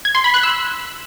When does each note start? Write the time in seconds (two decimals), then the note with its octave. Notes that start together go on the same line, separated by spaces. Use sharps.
0.05 G#6
0.15 C6
0.24 B5
0.34 F#6
0.43 E6